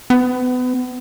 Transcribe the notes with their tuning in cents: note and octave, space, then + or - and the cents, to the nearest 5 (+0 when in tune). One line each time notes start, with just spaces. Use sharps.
B3 +30